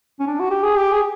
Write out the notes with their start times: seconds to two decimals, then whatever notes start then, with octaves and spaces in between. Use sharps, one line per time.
0.20 C#4
0.27 D4
0.40 F#4
0.51 G4
0.63 G#4
0.76 G4
0.92 G#4